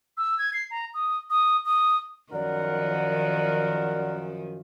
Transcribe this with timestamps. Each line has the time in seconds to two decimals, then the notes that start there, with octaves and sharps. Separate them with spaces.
0.17 E6
0.38 G#6
0.53 C7
0.71 A#5
0.94 D#6
1.30 D#6
1.66 D#6
2.33 F#2 D#3 F3 A#4 D5 F#5